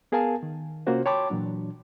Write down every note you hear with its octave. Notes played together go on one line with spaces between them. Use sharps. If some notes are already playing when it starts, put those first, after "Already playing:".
B3 G#4 A#4 F5 G#5 A5
D#3
C3 A#3 C#4 F4 F#4 C5
C#5 G5 A5 B5 C6 D6
A#2 E3 F#3 D4